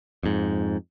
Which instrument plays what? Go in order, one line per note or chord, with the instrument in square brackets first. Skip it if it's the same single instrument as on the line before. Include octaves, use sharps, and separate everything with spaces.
[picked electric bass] F2 G#2